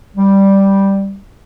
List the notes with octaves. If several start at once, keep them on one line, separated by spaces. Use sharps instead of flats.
G3